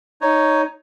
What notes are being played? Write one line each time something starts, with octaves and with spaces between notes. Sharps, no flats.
D#4 C#5